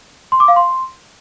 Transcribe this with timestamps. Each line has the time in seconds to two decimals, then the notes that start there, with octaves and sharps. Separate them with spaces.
0.32 C6
0.40 D6
0.48 F5
0.56 C6